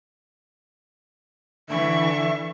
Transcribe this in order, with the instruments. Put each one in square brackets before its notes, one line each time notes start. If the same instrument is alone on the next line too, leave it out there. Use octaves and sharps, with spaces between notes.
[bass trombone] D3 [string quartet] E3 C#6 [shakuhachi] E5